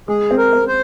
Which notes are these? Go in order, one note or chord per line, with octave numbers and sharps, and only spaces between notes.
G#3 G#4
C4
A#4
C4
C5